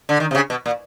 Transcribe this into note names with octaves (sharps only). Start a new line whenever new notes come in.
D3
D#3
C3
C#3
B2
A#2